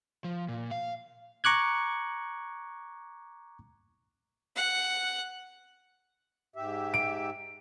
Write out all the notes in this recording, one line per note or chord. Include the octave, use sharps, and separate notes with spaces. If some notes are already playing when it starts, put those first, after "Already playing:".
F3
A#2
F5
A#5 C#6 D6 F#6 G#6
F#5
G#2 G4 E5
D7